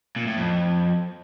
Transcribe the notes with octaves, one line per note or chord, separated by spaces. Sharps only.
A#2
A2
F2